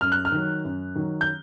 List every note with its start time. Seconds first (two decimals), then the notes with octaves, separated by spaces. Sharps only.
0.01 F#2 F6
0.12 F#6
0.25 F6
0.32 D#3 F#3
0.65 F#2
0.96 D#3 F#3
1.21 G6